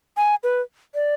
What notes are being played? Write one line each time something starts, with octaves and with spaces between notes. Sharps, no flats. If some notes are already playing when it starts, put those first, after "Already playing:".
G#5
B4
D5